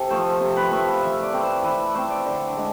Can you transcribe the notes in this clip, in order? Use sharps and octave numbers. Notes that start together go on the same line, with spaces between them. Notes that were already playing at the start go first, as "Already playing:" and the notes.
Already playing: C3 A4
F3 A3 C5
C3 C5
B4
F3 A3 E5
F5
E3 E5
D5
A3 C4
C5
E3 B4
A3 C4 C5
D5
D3
G#3 D4